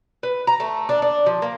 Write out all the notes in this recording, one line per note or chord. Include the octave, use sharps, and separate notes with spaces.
B4
A#5
A3
D4
D4
F3
A#3